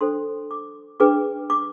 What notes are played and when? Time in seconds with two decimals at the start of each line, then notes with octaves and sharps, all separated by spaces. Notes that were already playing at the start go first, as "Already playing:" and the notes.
0.01 D4 A4 C5 C6
0.51 D6
1.00 D4 G#4 B4 D6
1.50 D6